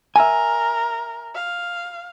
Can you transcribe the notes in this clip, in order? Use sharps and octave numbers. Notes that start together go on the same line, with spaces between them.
A#4 E5 G#5
F5